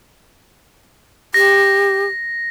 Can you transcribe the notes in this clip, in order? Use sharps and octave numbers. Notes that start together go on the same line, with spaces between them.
G4 A#6